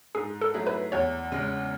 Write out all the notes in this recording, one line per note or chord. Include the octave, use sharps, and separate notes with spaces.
G#2 G#4
A4
F#3 A3 E4 G#4
B4
E2 C#5
C#3 G#3